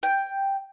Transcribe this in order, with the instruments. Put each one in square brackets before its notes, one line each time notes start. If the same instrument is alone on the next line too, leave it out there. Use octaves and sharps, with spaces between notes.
[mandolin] G5